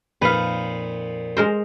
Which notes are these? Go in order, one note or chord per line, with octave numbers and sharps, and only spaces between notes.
F2 A#2 D#4 B4 F5
G#3 A#4 C5